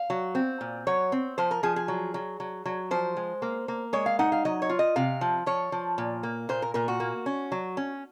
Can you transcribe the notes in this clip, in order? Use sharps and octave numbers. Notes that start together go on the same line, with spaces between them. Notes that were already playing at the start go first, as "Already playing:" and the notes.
Already playing: F5
F#3
C4
A#2
F#3 C#5
C4
F3 C5
A#4
F3 G#4
G#4
F#3
F#3
F#3
F#3
F3 C5
G#3
A#3
A#3
G#3 C#5
F5
D#4 F#5
F5
F#3 D#5
C#5
F4
D#5
C3 F5
F3
F3 C#5
F3
A#2
A#3
A#2 C5
A#4
A#2 A#4
F#4
A#3
C#4
F#3
C#4